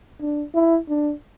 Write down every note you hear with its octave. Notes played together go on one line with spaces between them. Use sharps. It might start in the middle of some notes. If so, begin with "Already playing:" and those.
D4
E4
D4